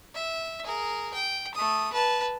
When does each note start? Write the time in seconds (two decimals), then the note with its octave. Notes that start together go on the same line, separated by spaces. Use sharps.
0.14 E5
0.64 G#4 A#4
1.14 G5
1.55 A3 D#6
1.93 B4 A5